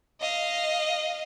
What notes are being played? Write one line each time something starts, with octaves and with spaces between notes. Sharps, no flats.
D#5 F5